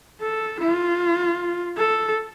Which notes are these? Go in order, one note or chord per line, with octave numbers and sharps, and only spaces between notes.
A4
F4
A4